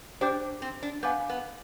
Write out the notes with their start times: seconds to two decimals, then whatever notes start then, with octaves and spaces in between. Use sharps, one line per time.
0.21 D4 G4 C5 G5 D6 G6
0.62 C4
0.83 D4
1.03 B3 F5 G#5 D6 G6
1.30 B3